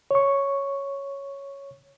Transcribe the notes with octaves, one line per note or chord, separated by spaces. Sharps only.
C#5 C#6